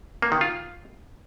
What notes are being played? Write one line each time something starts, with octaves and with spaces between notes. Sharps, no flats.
A#3
D#3
F4